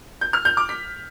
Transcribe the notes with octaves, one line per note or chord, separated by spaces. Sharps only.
G6
F6
G6
D6
B6